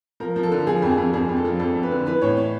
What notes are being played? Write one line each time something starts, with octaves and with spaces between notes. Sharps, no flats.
F3 A#4
F3
A4
D3
F3 G#4
F2
G#4
F2
F2 G#4
F2
A4
F3
F2 A4
F2
B4
D3
E3 B4
A2 C#5
C#5